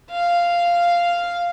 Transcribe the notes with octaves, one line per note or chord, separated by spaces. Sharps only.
F5